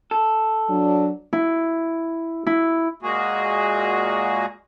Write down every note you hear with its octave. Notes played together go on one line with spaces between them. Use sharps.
A4
F#3 D4
E4
E4
A#2 G#3 A#3 F#4 G#4